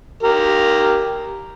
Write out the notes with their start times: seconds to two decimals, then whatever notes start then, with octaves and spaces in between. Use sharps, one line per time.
0.23 G4 A#4